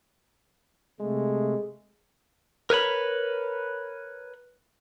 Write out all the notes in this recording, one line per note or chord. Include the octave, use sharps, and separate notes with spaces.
C3 G#3 A3
A#4 B4 C#5 B5